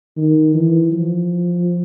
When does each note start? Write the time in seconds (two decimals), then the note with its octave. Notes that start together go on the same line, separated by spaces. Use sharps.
0.17 D#3
0.54 E3
0.92 F3